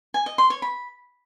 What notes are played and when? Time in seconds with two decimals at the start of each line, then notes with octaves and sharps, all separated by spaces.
0.14 G#5
0.26 D#5
0.38 C6
0.50 C#5
0.62 B5